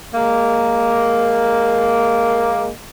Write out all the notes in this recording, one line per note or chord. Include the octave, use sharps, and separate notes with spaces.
G#3 A#3